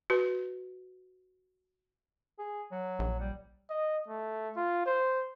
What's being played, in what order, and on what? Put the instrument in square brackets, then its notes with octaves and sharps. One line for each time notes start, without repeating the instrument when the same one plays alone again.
[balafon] F#4 B4
[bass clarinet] G#4
F#3
[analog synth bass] A#1
[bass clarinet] G3
[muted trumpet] D#5
A3
F4
C5